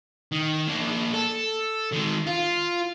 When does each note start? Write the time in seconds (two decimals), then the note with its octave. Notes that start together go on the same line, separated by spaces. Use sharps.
0.32 D#3
0.67 A#3 D4
1.14 A4
1.92 D#3 G#3
2.27 F4